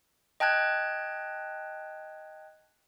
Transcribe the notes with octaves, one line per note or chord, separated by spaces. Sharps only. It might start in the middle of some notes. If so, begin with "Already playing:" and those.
D#5 G5 A5 F#6 G#6